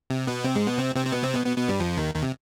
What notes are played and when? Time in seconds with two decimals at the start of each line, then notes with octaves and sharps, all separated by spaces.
0.10 C3
0.27 B2 B3
0.44 C3 C4
0.55 G#2 G#3
0.67 B2 B3
0.78 C3 C4
0.95 C3 C4
1.07 C4
1.12 B2 B3
1.23 C3 C4
1.34 B2 B3
1.46 B2 B3
1.58 B2 B3
1.68 G2 G3
1.80 F2 F3
1.97 D#2 D#3
2.14 D#2 D#3
2.23 C3